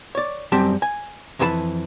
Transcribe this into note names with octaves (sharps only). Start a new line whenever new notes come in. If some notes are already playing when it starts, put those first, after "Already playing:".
C#5 D5
F#2 G3 C4 G4 A5
G#5
F2 E3 E4 G#4 A5 B5